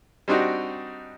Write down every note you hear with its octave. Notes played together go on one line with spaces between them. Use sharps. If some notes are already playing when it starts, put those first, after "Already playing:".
G3 C4 D4 D#4 F#4